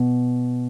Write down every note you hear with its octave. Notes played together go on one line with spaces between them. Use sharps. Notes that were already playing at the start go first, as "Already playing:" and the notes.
Already playing: B2